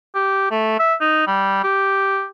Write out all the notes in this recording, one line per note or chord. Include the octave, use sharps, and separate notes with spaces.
G4
A3
E5
D#4
G3
G4